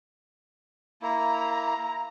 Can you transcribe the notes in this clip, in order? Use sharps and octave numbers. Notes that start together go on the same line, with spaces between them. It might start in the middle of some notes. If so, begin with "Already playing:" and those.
A#3 E4 A#5